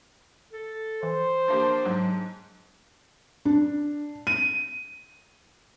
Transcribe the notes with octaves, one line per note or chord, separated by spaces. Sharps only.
A4
E3 C5
F3 A#3 D4 G4
G#2 F#3
D4
D#7